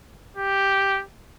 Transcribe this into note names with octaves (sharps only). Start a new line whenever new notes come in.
G4